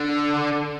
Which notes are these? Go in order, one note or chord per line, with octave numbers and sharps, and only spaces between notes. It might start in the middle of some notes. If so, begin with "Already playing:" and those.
Already playing: D3